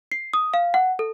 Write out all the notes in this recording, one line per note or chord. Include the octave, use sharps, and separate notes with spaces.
C7
D#6
F5
F#5
A4